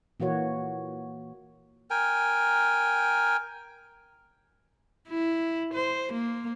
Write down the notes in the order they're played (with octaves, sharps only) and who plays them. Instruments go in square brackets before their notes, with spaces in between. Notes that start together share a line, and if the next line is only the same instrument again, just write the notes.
[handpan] A#2 E3 A#3 F#4 C#5
[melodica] A#4 G5 G#5
[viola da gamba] E4
C5
A#3